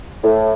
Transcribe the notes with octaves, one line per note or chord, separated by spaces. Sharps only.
A2